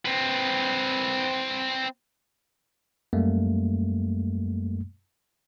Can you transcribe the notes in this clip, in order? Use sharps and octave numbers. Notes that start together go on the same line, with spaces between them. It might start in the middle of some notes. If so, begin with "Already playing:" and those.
C4 B4
F#2 G3 A3 A#3